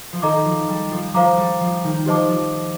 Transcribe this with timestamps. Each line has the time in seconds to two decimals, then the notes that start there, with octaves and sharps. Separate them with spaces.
0.13 F3
0.22 D#3 A4 D#5 A#5 D6
0.45 F3
0.69 G3
0.91 F3
1.14 F3 C5 F5 A#5 D6
1.37 G3
1.61 F3
1.84 D#3
2.06 F3 G4 C5 D#5 A5 D6
2.29 F3